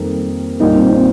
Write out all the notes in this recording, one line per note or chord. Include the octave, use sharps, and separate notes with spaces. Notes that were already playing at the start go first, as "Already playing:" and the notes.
Already playing: F2 D#3 G3 A#3
A#1 A#2 G3 A#3 D#4
C4
C4